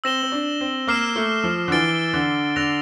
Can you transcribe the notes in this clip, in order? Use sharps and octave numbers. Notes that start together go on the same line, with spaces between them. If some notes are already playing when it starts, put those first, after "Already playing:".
C4 E6 A#6 E7 G7
C4
D4
C4
A#3 D6 F6 C7 E7
A3
F3
D3
E3 F6 A6 D7 G7
D3
D3 E6 A#6 F7